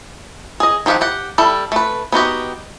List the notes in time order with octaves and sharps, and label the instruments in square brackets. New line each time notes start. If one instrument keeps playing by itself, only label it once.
[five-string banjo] G#4 D#5
D#3 F3 G4 F5 F#5
G4 F#5
G3 E4 A4
A3 B4
B3 D#4 F#4 G4